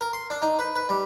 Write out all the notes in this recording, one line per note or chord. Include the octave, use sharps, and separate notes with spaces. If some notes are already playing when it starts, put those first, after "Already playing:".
A#4
C6
D4
D#4
B4
B4
G3